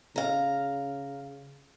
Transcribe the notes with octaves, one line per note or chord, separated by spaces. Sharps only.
C#3 F5 A#5